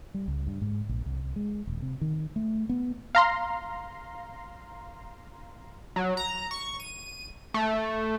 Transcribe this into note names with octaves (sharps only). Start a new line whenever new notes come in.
G3
C#2
G2
G#2
A#1
C2
G#3
D#1
C3
D#3
A3
B3
F5 A#5 C6
F#3
A#5
C#6
D#7
A3